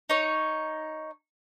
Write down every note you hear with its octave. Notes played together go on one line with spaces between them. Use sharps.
D#4 C#5